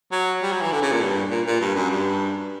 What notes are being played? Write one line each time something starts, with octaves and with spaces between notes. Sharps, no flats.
F#3
G3
F#3
E3
D3
C#3
A#2
G2
A#2
A#2
G2
F#2
G2